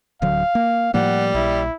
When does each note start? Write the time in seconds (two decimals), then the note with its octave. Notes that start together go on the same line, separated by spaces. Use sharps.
0.22 D1 D3 F#3 F5
0.55 A#3
0.94 A2 F3 G3 A#3 F#5
1.35 A#1 E4